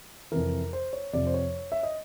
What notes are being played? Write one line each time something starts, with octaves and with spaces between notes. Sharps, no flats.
F2 C3 E3 A#4
C5
C#5
F2 C3 F3 D5
C5
C#5
E5
D#5